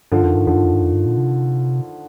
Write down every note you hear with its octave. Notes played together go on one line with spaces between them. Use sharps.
G2 D3 F3
F2 D#3
G2 D#3
F2 D3 F3
G2
F2
G2
F2
G2
A#2
C3